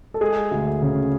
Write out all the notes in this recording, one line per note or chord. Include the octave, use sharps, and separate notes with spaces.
A4
G#3 G#4
D2
C#3